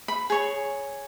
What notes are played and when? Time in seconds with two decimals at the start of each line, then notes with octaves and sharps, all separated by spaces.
0.08 B5
0.30 G#4 C#5